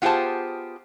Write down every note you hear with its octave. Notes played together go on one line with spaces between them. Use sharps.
B3 F4 G4 G#4 C5 A5